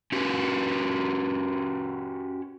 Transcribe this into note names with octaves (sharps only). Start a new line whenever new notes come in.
C#4 F#4 G4